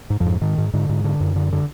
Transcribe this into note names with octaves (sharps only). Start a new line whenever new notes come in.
G#2
F2 G#2 F3
G#2 D#3
G#2
G#2 D3
G#2
D3
F#2
D3
D3